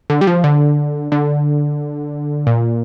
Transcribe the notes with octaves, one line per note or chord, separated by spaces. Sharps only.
D3
G3
F3
D3
D3
A#2